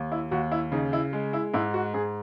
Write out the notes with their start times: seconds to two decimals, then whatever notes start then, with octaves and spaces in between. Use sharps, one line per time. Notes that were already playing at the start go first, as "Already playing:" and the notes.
Already playing: D#2
0.12 E4
0.31 D#2 F#4
0.52 E4
0.72 C#3 D#4
0.93 E4
1.13 G#3
1.33 E4
1.53 G#2 E4
1.74 F#4
1.94 G#2 G#4